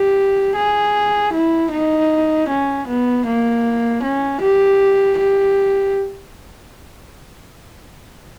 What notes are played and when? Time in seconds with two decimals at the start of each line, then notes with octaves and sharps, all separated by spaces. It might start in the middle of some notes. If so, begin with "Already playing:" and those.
Already playing: G4
0.56 G#4
1.33 E4
1.71 D#4
2.49 C#4
2.87 B3
3.26 A#3
4.03 C#4
4.41 G4
5.18 G4